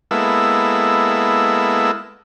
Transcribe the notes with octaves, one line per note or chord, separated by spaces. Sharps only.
G#3 A#3 B3 E4 A4 E6